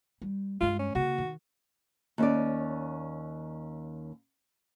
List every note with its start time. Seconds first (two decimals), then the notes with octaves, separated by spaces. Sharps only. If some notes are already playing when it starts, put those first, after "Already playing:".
0.22 G3
0.61 G2 G#3 F4
0.79 C#4
0.95 C#3 A#3 F#4
1.18 D#3
2.18 D#2 C#4 D5